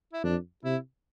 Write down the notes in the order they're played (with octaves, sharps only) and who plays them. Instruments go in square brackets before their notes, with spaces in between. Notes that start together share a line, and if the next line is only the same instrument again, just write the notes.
[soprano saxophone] E4
[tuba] F2 [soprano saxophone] D4
[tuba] C3 [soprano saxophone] E4